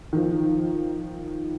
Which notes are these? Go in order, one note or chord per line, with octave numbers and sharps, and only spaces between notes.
D#3 F3